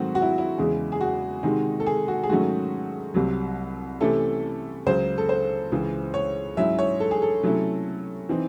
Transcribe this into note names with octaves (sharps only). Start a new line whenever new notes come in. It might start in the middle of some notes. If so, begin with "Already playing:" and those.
Already playing: G#2 D#3 F#3 A3 C4 F#4
F#4
E4
E4
E2 C#3 G#3
G#4
F#4
C3 D#3 G#3 D#4
A4
G#4
F#4
G#4
G#2 D#3 F#3 A3 C#4 F#4
C2 C3 F#3
C3 E3 A3 C#4 E4 A4
C#2 C#3 F#3 C5
A4
C5
C#2 C#3 E3
C#5
G#2 F#3 C#4 E4 E5
C#5
A4
G#4
A4
C3 F#3 A3 C#4 E4
E3 C4 D#4